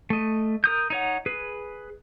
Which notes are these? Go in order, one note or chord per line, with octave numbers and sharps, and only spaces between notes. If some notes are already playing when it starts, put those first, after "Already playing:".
A3 D#5
A#4 D#6 G6
D#4 C#5 F#5
G#4 B4